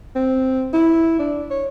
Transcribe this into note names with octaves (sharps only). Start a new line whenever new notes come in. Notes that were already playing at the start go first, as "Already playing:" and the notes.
C4
E4
D4
C#5